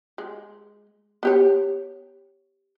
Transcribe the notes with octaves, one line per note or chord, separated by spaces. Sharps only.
G#3
B3 G4 C#5